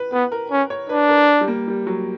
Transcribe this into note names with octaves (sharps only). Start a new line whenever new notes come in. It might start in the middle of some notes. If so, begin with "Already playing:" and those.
Already playing: B4
B3 B4
A#4
C#4
C#5
D4 B4
A#4
G3
A#3
G3
F#3